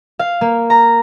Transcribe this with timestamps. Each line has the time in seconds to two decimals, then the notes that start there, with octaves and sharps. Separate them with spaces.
0.19 F5
0.41 A#3
0.70 A#5